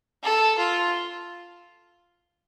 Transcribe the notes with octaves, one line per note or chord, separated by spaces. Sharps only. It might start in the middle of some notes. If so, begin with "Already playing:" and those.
A4
F4